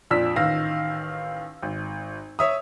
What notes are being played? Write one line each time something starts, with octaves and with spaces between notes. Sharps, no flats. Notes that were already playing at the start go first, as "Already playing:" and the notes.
F2 A#2 D4 E6 B6
A1 D#3 F5 A#6
G#1
C#5 E5 D#6